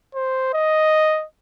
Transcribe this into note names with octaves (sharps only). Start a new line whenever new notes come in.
C5
D#5